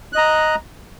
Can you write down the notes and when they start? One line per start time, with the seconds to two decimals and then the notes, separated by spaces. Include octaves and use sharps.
0.13 F#6
0.15 D#5
0.18 A#5